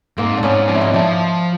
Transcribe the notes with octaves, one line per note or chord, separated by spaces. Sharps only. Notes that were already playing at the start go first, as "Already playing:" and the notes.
G#2 A#3 C4
D4
G#2 B3 C#4
F3 C4 D4
E4
C#4 D#4
F3 D4 E4